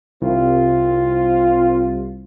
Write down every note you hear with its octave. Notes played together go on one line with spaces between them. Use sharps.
C2 C4 F4